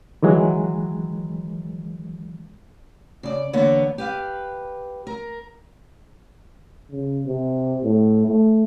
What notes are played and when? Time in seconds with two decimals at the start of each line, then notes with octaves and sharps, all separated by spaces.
0.22 D#3 E3 F#3 G#3
3.23 C#3 D5
3.53 E2 D3 A#3 B3 C#5
3.98 G4 B4 F5
5.07 A#4
6.91 C#3
7.26 C3
7.83 A2
8.26 A3